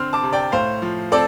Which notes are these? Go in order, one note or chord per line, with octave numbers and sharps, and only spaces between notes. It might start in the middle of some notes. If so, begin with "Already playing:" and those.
Already playing: D3 C4 C6 F6
A5 D6
C3
D5 G5
A2 C5 F5
F3
C4 A4 D5